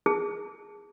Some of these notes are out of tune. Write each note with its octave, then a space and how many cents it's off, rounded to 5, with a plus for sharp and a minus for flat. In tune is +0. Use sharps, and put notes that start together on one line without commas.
G#4 -10 A5 +0